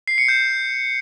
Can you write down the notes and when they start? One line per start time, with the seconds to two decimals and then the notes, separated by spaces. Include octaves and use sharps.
0.08 C7
0.18 C#7
0.28 G6